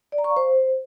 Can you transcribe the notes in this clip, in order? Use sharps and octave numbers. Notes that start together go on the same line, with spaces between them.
D5
A#5
C#6
F5
C5